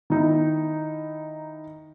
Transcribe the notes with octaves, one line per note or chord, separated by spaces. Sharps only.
D#3 D#4 E4